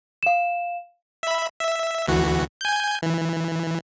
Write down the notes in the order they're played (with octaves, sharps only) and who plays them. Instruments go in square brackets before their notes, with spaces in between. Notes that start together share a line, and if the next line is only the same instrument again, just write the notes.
[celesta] F5 E7
[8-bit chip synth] E5 B5
E5
D2 E3 F#4
G#5 G6
E3